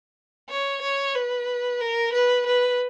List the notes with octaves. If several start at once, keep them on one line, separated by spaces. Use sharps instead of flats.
C#5
C#5
B4
A#4
B4
B4